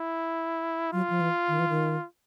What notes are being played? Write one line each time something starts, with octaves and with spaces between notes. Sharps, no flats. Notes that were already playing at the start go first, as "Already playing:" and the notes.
Already playing: E4
F#3 F4
F3
E3
D#3
E3
D#3